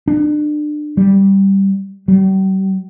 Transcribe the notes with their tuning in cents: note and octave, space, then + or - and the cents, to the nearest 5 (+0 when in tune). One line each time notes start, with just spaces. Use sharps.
D4 +30
G3 -5
G3 -40